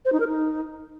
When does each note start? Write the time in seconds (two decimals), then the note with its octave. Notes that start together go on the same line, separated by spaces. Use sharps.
0.05 C5
0.13 D#4
0.20 A#4
0.27 D#4